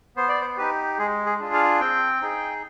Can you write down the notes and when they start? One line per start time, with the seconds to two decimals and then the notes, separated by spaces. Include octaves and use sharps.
0.16 B3 C5
0.29 D5
0.41 C5
0.57 D#4 G4 B4
0.98 G#3 G#4
1.26 G#4
1.39 D4 F4 G#4
1.53 F5
1.80 C4 G5
2.22 D#4 G#4